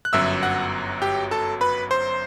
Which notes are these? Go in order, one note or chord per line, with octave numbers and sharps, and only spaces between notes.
F#6
G1 F#2 F#3 E5 E6
F#5 F#6
G4 G5
A4 A5
B4 B5
C5 C6